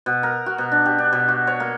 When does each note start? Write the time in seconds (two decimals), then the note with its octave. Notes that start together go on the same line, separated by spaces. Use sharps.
0.06 B2
0.23 A#4
0.46 F#4
0.58 B2
0.72 D4
0.86 G4
0.98 D4
1.13 B2
1.28 F#4
1.47 C#5
1.60 A#3